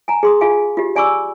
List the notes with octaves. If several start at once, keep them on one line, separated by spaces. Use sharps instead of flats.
G#5 A#5
G#4 C6 D#6
F4 G#4 F5 G#5
F4 G4
D5 G#5 B5 C#6 D6 E6